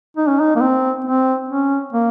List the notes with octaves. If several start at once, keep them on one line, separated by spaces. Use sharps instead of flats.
D#4
C#4
D#4
A#3
C4
C4
C#4
A#3